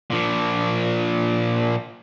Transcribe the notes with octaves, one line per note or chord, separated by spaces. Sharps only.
A#2 F3